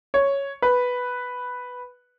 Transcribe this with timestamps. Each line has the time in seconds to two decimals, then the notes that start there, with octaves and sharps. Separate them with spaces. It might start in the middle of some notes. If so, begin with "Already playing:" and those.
0.14 C#5
0.62 B4